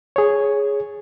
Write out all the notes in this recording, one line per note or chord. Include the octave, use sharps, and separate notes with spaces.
G#4 C#5